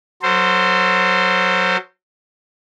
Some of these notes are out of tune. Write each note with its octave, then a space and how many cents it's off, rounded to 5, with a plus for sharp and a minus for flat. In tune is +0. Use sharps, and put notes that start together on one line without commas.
F#3 -5 A4 +45 C5 -5